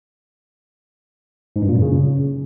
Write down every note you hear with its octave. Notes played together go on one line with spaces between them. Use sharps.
G#2
G2
A#2
F#2
C#3